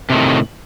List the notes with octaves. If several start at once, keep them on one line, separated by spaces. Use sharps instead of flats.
A2 C3 D#3